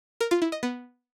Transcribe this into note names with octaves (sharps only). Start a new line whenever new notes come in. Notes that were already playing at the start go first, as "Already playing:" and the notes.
A#4
F4
E4
D#5
B3